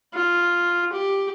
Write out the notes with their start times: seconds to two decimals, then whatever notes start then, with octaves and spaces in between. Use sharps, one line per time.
0.14 F4
0.92 G4